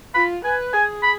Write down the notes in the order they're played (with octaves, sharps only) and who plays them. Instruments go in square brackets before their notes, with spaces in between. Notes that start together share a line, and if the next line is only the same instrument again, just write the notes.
[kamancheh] F4 [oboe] B5
[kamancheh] B4 [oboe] G#5
[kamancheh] G#4 [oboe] G#5
[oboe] B5